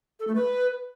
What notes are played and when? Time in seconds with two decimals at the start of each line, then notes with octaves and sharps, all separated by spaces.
0.20 A4
0.27 A3
0.35 B4